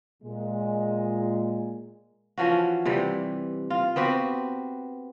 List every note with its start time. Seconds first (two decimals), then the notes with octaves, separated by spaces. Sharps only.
0.23 A#2 G#3
2.38 E3 F3 C#4 F#4
2.85 C3 E3 G3
3.70 F4
3.96 B3 C4 F#4 G4